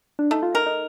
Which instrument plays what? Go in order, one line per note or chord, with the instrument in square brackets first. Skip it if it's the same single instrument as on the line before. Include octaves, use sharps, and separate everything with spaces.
[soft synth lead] D4
[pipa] A3 [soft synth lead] D#4
[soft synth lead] F4
[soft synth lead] D#4 [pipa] A#4
[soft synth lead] D#4